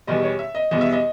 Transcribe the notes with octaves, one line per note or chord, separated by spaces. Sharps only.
E2 B2 G3 D#5
C#5
E5
D#5
E2 B2 G3 D#5
E5
D#5